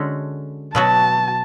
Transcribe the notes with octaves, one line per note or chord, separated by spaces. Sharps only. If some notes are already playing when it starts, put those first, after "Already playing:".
Already playing: D3 G#3 C#4 F#4 A4
B2 F#3 B3 F#4 A5